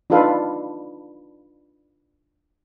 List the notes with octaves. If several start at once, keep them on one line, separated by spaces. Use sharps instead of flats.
D4 D#4 F4 A4 B4 F5